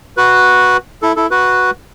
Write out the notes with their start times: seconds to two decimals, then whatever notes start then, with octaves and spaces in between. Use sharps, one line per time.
0.17 F#4 B4
1.02 E4 A4
1.16 E4 A4
1.31 F#4 B4